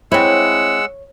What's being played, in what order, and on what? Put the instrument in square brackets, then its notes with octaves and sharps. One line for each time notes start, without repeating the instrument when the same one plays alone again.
[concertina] G#3 F#5 E6 [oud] C4 E4 [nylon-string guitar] C#5